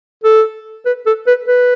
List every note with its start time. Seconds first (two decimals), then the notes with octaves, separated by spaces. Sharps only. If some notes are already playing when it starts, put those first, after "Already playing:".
0.24 A4
0.86 B4
1.06 A4
1.27 B4
1.48 B4